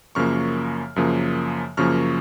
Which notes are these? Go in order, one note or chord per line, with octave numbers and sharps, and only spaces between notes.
F#2 C#3 F3 A#3 C#6 F6
F#2 C#3 F3 A#3
F#2 C#3 F3 A#3 C#6 F6